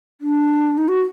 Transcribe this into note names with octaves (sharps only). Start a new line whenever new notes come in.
D4
D#4
F#4